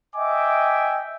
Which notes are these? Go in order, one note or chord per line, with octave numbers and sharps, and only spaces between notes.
D#5 E5 G5 G#5 D6